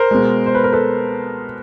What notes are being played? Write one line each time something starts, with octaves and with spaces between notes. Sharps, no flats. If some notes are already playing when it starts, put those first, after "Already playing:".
Already playing: A#4 C5
B2 G#3
C5
B4
A#4
A4 B4